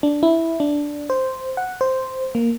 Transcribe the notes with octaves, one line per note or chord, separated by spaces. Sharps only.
D4
E4
D4
C5
F#5
C5
A#3